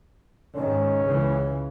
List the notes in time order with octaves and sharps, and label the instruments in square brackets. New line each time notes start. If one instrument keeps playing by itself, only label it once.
[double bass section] G#2 D#3 [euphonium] C#4
[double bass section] C#2 C#3 E3